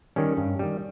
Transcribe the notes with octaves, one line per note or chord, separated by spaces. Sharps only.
D#3 G3 C#4
G2
D#3 G3